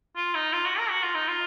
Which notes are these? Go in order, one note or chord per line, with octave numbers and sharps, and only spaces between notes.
F4
D#4
F4
F#4
A#4
F#4
F4
D#4
F4